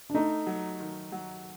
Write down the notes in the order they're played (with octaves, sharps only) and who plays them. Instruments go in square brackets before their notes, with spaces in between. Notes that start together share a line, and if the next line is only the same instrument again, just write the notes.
[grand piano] D4
[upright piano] A3 [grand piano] D#4
[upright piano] F#3
D#3
F#3